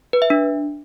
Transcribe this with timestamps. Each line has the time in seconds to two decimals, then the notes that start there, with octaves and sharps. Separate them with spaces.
0.13 B4
0.22 E5
0.30 D4